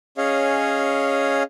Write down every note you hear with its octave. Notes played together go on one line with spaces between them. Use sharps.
C#4 G#4 C#5 D#5 F5